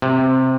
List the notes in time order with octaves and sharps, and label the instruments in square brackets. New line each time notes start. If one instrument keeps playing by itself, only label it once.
[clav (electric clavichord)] C3